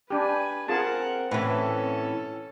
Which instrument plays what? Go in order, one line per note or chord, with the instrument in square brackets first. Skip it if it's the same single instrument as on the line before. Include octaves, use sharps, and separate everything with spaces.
[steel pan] D4 G4 [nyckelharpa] B4 G#5
[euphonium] C4 [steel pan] F4 G#4 A5 [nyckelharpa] A#4 F#5
[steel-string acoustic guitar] A2 E3 [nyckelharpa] C#4 A4 [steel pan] B4